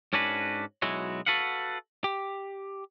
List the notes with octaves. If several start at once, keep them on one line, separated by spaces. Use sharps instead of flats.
G#2 C#4 D4 F#4 B4
B1 F#3 G#3 E4 F#4
F#4 A4 B4 F5 F#5
G4